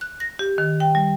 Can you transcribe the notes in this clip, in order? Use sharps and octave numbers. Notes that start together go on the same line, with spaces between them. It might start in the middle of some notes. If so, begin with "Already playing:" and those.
F#6
A#6
G4
D#3
G5
G3